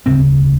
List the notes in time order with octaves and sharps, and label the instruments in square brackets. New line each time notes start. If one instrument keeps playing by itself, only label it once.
[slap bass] E1 D2 C#3 C4